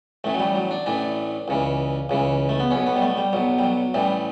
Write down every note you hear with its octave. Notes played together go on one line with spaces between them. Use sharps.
A1 A2 E3 A3
F#3
G3
F#3
D4
A1 A2 E3 D4
C#2 C#3 E3
C#2 C#3 E3
A3
B3
B1 B2 C#4
B3
G3
A3
G3
B1 B2 F#3
G3
F#3
A1 A2 E3 G3